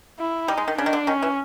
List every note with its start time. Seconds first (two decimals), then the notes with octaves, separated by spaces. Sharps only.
0.19 E4
0.48 G3 D#4
0.57 G#3
0.68 D#3
0.78 C#3 D4
0.86 D#3
0.93 D3
1.07 D#3 C#4
1.22 E3